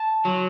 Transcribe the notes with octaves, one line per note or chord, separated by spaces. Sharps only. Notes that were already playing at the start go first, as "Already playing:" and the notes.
Already playing: A5
F#3